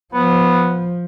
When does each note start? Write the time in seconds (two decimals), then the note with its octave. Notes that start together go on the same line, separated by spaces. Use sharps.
0.14 F3 B3